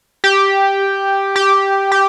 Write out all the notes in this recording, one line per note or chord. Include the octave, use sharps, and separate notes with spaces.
G4
G4
G4